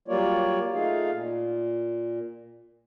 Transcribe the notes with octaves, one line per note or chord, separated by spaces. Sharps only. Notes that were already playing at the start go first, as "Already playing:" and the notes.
F#3 G3 A#3 F4 C#5 D5
A3 D#4 F4 G#4 F5
A#2